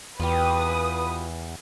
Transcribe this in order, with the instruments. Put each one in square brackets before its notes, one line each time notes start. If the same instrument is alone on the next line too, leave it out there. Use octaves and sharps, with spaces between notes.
[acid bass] E2 [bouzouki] F4 G4 [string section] B4 D#6